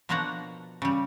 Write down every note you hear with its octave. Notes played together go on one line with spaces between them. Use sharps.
B2 F3 A#3 D4 F#4 A#5
C#3 G3